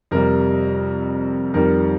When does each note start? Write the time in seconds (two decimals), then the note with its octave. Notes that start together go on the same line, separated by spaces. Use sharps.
0.11 F2 C3 G3 A#4
1.54 F2 D#3 G3 A#4